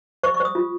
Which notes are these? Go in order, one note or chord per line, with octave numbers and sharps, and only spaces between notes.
C5 C#6
C#6
C5 D#6
F4